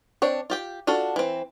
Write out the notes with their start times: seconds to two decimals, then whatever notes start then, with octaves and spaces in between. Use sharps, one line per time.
0.22 C4 D4 C#5
0.50 F4 G4 G5
0.87 D4 F4 F#4 A4
1.16 E3 C4